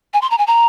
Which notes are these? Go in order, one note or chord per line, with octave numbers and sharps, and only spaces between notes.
G#5
C6
A#5
G#5
A#5